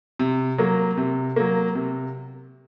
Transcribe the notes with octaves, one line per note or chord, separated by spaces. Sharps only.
C3
F#3 A#3
C3
F#3 A#3
C3